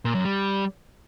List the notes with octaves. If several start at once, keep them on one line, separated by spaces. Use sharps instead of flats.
A#2
F#2
G3